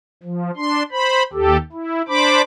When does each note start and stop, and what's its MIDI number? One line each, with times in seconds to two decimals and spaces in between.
0.23 0.51 53
0.57 0.83 62
0.57 0.83 84
0.92 1.23 72
0.92 1.23 83
1.33 1.57 39
1.33 1.57 67
1.33 1.57 69
1.72 2.02 64
2.08 2.42 62
2.08 2.42 72
2.08 2.42 83
2.08 2.42 86